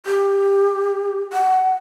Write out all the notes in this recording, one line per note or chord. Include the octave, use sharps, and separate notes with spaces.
G4
F#5